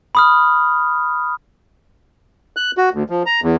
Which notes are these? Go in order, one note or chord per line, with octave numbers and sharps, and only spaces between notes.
B5 D#6 F6
F#6
F#4
D2
F3
A#5
E2